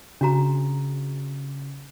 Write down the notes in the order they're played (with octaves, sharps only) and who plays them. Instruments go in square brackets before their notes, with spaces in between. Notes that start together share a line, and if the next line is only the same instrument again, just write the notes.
[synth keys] C#3 [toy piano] D4 F#4 A#5